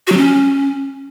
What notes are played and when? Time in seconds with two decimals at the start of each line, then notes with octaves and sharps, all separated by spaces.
0.07 F#4
0.12 F#3
0.17 C#4